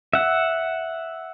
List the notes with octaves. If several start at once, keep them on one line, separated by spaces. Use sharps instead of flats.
E5 F#5